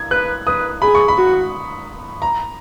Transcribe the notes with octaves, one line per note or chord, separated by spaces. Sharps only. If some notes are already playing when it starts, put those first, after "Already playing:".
Already playing: G#6
B4 F#6
B4 D#6
G#4 B5
C#6
B5
F#4
A#5